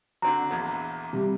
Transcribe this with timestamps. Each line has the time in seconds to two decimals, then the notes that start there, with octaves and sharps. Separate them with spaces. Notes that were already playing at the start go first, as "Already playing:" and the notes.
0.22 D3 C4 F#4 A#5
0.51 A#1 E2
1.13 C3 G3